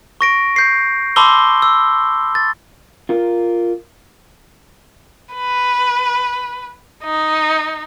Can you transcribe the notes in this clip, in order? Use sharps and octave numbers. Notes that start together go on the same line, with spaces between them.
C#6 A#6 D7
G6 C7
A5 B5 C6 D6 E6 G7
E6
A6
F4 A#4
B4
D#4